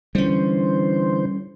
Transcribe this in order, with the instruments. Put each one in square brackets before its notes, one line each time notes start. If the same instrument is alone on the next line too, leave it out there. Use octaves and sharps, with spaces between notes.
[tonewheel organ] D3 E3 C5 [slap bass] G3 C#4